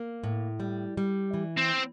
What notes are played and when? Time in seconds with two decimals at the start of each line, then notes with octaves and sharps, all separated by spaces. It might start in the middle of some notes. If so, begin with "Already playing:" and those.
Already playing: A#3
0.24 A2
0.60 G3
0.97 G3
1.34 E3
1.58 C4